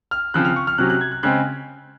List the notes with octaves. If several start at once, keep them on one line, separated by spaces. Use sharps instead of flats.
F6
C#3 F3 C4 F#6
F6
C#6
F6
C3 F#3 C#4 F#6
F#6
G#6
F#6
C#3 G#3 C4 F#6